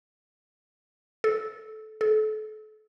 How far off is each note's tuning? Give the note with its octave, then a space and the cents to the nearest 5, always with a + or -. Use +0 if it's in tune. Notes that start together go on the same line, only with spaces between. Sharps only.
A4 -20
A4 -35